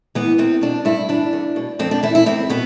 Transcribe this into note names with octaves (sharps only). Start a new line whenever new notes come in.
E3 B3
E2 C4
B2 D4
G2 E4
E3 D4
E2
B2
F2 C4
D4
E3 E4
E4
E2 C4
B2 B3